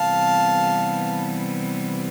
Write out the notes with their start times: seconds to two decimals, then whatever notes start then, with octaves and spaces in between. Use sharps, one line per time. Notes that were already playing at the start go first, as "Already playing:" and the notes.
Already playing: C3 E3 G3 B3 F5 A5